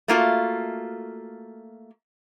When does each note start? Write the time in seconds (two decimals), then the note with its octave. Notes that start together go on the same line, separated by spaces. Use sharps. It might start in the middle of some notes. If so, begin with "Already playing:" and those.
0.08 A3 A#3 F4 F#4